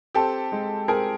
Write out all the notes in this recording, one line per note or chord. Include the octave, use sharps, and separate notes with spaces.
C4 G4 A4
G#3
C4 G#4 A#4